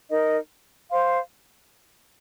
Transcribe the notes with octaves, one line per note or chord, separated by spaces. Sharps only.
D#4 A#4 D#5
C5 F5 C6